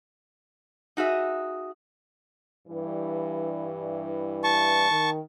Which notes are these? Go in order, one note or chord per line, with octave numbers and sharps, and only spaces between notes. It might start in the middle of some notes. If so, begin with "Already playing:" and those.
D#4 F#4 G#4 E5
G2 E3
A5 C#6
D#3